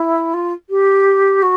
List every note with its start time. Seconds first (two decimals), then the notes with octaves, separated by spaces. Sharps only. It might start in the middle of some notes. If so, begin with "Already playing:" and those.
Already playing: E4
0.33 F4
0.69 G4
1.42 F#4